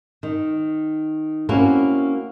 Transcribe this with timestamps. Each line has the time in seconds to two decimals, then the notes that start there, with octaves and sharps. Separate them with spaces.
0.23 D#3
1.49 A#3 C4 C#4 E4 F#4 A#4